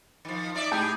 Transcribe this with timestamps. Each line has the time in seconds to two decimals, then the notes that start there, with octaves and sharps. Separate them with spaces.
0.25 D#3 F3
0.55 D#4 D5 E5
0.72 A2 D#4 G4 G#4 G5